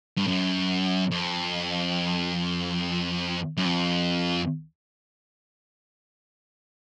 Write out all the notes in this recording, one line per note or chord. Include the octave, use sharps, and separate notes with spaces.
G2
F#2
F2
F#2
F2